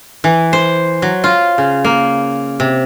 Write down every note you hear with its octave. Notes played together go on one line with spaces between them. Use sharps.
E3
C5
F#3
F4
C#3
A#3
C3